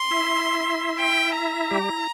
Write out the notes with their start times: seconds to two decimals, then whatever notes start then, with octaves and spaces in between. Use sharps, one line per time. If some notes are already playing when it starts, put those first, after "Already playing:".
Already playing: C6
0.11 E4 E5
0.99 G5
1.36 A#5
1.70 G3 G4
1.89 E4